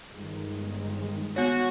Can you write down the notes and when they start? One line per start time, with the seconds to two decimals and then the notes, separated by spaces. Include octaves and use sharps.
0.13 G1 D#3 G#3
1.36 B3 F#4 C#5